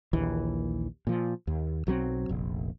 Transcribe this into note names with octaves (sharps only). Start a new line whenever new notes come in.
A#1 D#2 E3
A#2 F3
D#2
B1 F#3 G3 C4
F1 A#1